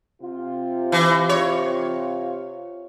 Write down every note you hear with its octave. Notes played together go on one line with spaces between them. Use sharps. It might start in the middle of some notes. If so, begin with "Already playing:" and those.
C3 F4
E3
C#5